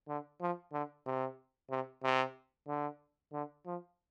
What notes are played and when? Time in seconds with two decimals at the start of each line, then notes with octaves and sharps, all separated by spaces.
0.08 D3
0.41 F3
0.73 D3
1.06 C3
1.70 C3
2.03 C3
2.68 D3
3.33 D3
3.66 F3